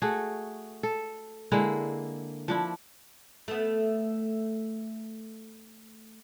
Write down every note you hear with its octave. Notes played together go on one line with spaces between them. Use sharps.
A3 F#4 G#4
A4
D3 G#3 A#3 E4
F3 D4 E4
A3 B3